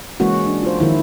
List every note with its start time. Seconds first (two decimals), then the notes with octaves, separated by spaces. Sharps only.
0.20 E3 G#3 A#3 C#4 F#4
0.47 D4
0.63 F4 C5
0.79 D#3 F3 E4 C5